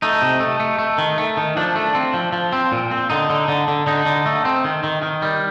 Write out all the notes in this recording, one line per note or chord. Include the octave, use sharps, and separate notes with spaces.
A3 D#4
C3
A3
A3
A3
D#3
A3
D#3
F3 D4
A3
C4
F3
F3
C4
A#2
C4
D3 D#4
D3
D3
D3
D3 D#4
D3
A3
C4
D#3
D#3
D#3
G3